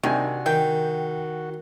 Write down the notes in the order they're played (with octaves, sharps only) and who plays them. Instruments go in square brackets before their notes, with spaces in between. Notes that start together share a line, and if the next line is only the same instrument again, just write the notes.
[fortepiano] C3 D4 G#5 [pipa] D#3 [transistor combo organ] F#4
[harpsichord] D#3 [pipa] G5